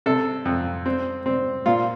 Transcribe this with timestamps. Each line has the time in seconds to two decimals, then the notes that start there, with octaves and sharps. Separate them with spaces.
0.06 C3 A4
0.45 F2
0.86 C4
1.26 C4
1.66 A#2 F4